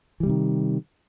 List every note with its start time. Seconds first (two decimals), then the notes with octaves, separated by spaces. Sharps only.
0.20 E3
0.23 G3
0.26 C3
0.29 D#3